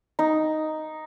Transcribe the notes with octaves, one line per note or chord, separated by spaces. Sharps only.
D#4